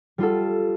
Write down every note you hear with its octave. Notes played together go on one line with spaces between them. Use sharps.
G3 F4 A4